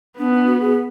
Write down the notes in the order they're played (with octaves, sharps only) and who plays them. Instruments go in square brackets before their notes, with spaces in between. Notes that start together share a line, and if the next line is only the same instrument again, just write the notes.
[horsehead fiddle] B3 [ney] D4
[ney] D4
F#4
G#4